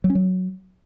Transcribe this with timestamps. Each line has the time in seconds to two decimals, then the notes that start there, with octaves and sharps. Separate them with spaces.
0.04 F#3
0.10 C#4
0.15 F#3